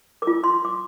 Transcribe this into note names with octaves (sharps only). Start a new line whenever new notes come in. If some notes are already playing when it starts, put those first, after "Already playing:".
A#4 D6
F4
C6
D6